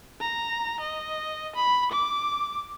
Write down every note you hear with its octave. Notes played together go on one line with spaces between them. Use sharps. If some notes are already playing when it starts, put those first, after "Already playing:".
A#5
D#5
B5
D6